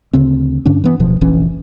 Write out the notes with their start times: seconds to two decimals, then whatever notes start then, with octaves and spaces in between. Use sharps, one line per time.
0.13 D2 C#3 C4
0.66 G2 D3 C#4 D4
0.84 E3 B3
1.00 D1 B2 F3
1.21 F1 A#1 E3 C#4